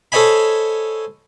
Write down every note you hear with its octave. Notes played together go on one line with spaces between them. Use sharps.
A4 C5 C#5 D#5 G#5 B5